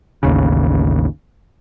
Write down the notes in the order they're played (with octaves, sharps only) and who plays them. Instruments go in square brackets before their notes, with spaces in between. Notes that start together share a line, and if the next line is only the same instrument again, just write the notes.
[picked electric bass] A1 D#2 C#3